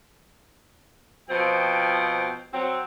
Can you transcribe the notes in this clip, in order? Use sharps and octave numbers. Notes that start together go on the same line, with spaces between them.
B2 F3 C4 C5 G5
F#3 C4